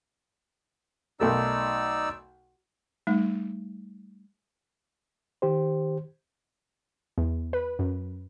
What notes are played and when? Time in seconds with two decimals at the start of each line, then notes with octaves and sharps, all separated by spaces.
1.20 B1 A3 D#4 A#4 D5 E6
3.07 G3 A3 D#4
5.42 D#3 G4 C5
7.18 E2
7.53 B4
7.79 F#2